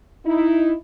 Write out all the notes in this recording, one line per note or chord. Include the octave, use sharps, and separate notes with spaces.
D#4 E4